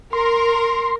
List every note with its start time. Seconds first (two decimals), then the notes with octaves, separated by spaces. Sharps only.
0.13 A#4 C6